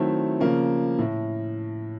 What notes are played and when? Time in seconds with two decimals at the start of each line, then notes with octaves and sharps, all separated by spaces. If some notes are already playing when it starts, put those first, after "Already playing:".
Already playing: D#3 F#3 A3 C4 E4
0.40 C#3 F3 A#3
0.99 A2